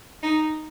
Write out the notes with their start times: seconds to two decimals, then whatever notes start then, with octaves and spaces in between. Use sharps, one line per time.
0.23 D#4